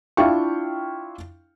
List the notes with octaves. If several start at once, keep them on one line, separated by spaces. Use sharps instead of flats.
D4 E4 F4 F5 G5 C#6